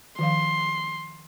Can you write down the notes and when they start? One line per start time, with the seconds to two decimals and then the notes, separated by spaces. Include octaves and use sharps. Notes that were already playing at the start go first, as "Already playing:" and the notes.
0.19 D#3 F3 F5 C6